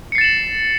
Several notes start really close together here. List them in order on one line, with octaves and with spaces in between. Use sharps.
C#7 C7 A6 E7 F#7